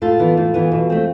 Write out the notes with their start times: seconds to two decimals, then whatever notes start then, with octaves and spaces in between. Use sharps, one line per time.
0.02 A2 F4 A4
0.19 E3 B3
0.37 A2
0.54 E3 B3
0.72 B2
0.90 A3 C4